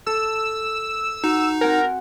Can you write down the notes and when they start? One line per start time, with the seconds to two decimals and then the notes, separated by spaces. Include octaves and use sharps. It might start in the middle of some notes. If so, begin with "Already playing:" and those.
0.06 A4 E6
1.24 D#4 F#4
1.61 C4 A#4 F#5 G#5